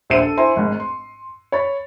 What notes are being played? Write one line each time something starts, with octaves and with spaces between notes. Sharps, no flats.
D#1 A#1 C5 E5 C#7 D#7
A4
E4 C5 E5 G#5 A#5 C6
G#1 G#2
C6
C#5 B5 A6